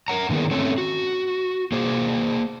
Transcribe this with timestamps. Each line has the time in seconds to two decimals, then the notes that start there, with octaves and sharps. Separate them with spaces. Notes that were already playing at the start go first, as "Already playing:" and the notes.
0.08 A#4 F#5 A#5
0.30 D3 D#3 A#3 B3 G#4
0.51 A3 C4 C#4 A4
0.78 F#4
1.72 A#3 G#4 C5